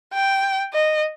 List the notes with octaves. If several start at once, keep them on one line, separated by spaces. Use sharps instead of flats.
G5
D#5